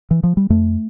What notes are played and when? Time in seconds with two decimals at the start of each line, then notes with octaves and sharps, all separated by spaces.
0.11 E3
0.23 F3
0.37 G3
0.50 F2 A3